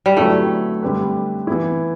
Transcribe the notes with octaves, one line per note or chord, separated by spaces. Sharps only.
G3
D3 F#3 A3 B3 E4 G4
D3 G3 D4 G4 B4
E3 B3 E4